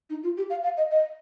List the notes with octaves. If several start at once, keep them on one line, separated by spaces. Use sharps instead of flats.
D#4
F4
G4
F5
F5
D#5
D#5